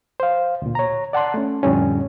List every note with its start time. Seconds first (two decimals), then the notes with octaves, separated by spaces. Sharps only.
0.20 C5 F5
0.62 D2 A#2
0.75 C#5 A#5
1.13 D5 F#5 A5 C6 F#6
1.34 A3 C#4
1.63 F2 A2 D3 G3 C#4